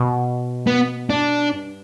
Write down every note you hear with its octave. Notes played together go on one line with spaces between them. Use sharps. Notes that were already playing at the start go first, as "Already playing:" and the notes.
Already playing: B2
B3
D4
G2